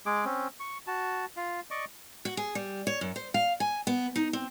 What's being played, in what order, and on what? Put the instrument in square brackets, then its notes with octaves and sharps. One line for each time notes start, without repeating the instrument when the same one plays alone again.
[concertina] G#3 G#4 D6
C4 C#4
C#6
F#4 A5
F4 F5
D5 D#5 C#6 D6
[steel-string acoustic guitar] F#4
G#4
G3
C#5
F#2
C5
F5
G#5
B3
D#4
C4